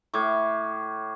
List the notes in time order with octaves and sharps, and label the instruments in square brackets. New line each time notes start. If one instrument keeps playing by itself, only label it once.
[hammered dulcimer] A2 [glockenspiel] C#6 D6 G#6